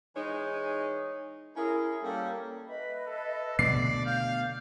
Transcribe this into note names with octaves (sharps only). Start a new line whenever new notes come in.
E3 G#3 D#4 C#5
C#4 E4 G#4 A#4
G3 A#3 C#4 A4
B4 D#5 E5 B5
A4
B2 D3 A3 D5 C7
F5 G6